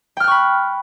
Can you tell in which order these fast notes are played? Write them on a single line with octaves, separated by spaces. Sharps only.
G5 F6 F#6 C#6 B5